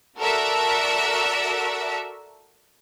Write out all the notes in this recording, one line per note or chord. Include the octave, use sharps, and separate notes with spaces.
F#4 A4 A#4 D5 E5